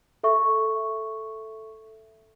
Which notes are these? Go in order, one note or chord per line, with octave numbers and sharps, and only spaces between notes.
A4 E5 C#6